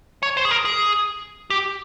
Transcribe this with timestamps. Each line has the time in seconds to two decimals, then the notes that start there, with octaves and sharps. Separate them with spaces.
0.23 C#5
0.37 C5
0.45 G#4
0.51 A#4
0.65 G#4
1.50 G4